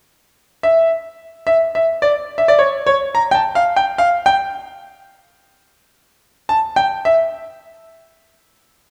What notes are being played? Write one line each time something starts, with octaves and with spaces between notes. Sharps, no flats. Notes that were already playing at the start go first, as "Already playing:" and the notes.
E5
E5
E5
D5
E5
D5
C#5
C#5
A#5
G5
A5
F5
G5
F5
G5
A5
G5
E5